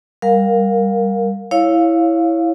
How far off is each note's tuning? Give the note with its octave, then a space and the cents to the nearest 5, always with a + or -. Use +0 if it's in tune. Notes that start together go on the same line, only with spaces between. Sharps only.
G3 +0 A#4 +0 F5 +20
E4 +0 C#5 +0 F5 +0